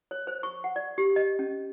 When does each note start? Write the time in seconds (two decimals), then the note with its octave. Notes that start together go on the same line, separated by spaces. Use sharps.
0.11 C#5
0.27 C5
0.43 C#6
0.64 F#5
0.76 D5
0.98 G4
1.16 D#5
1.39 C#4